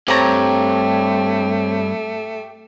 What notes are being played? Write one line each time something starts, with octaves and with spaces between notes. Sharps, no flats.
G2 A3 C4 G4 C#5 A#5